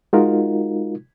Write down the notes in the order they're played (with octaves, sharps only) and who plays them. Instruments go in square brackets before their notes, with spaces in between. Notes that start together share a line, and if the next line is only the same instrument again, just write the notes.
[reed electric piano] G#3 D#4 F4 F#4 A#4